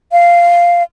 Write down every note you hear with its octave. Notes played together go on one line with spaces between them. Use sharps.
F5